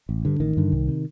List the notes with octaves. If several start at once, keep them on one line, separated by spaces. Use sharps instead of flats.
A1
G2 D3
A1 D#3
G2 D3
C2
C3